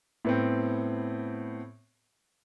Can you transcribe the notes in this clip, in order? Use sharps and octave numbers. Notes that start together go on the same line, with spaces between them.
A2 B3 C4